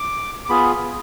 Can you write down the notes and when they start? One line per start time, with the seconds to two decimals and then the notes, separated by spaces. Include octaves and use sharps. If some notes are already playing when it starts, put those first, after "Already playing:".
Already playing: D6
0.45 D6
0.49 B3 F4 G#4 B5